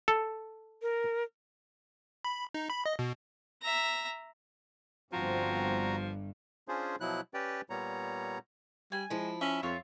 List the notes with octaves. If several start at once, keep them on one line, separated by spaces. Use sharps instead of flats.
A4
A#4
B5
D#4
B5
D#5
B2
E5 A#5
G1 G2 F3 C4 F#4 A#5
C#4 D4 F4 G#4 C5
B2 F3 F#3 E4 F#6
C#4 G4 B4 D5 G5
A#2 G3 B3 C#5 A#5
G3 G#5
F3 G#3 E4
C#4 E5
F2 F4 C#5 E5